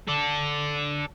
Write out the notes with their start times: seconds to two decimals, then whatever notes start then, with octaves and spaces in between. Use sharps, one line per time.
0.08 A4 D5